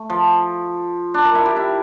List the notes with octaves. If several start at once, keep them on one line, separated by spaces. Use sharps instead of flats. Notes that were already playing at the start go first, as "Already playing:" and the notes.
Already playing: A3
F3
D4
A#4
E4
G4
E4